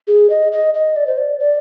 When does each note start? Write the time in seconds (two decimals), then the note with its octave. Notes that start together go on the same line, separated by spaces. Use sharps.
0.08 G#4
0.30 D#5
0.52 D#5
0.74 D#5
0.96 D5
1.07 C5
1.18 D5
1.40 D5